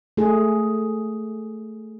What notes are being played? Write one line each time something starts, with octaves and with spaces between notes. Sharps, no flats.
A3 G#4